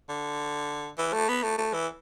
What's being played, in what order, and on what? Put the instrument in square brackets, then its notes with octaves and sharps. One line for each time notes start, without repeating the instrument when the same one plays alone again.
[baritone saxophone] D3
E3
A3
B3
A3
A3
E3